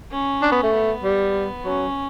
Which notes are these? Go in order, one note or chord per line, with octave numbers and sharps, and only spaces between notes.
C#4
D4
B3
A3
B3
G3
F#3 C#4